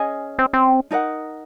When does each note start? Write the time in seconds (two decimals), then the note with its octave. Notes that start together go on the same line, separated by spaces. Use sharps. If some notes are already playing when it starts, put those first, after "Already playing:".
Already playing: C#4 G#4 D#5 G#5
0.39 C4
0.53 C4
0.91 D#4 A#4 D#5 F#5